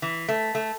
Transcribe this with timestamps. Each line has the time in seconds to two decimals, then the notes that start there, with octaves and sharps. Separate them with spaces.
0.02 E3
0.28 A3
0.55 A3